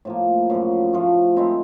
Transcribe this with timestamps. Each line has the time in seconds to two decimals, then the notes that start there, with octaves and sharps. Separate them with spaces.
0.05 A2 F3 A#3
0.50 F#2 C#3 F3
0.93 A2 F3 A3
1.36 D#3 G#3 C4 E4